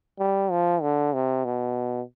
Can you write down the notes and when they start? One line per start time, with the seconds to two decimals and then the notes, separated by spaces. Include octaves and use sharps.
0.19 G3
0.51 F3
0.82 D3
1.13 C3
1.45 B2